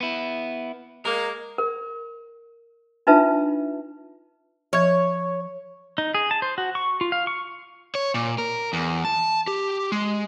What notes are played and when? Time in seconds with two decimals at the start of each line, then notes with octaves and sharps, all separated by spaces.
0.01 B3 E4
1.05 G#3 A#3 A#4
1.58 A#4
3.07 D4 D#4 F4 B4 E5 A5
4.73 F3 C#5 E5 G#6
5.98 D#4
6.14 G#4
6.31 A5
6.42 C5
6.58 F#4
6.75 C#6
7.01 F4
7.12 F5
7.27 C#6
7.95 C#5
8.14 A#2
8.38 A#4
8.73 E2
9.05 A5
9.47 G4
9.92 G#3